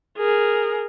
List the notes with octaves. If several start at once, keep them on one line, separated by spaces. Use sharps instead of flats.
G#4 A#4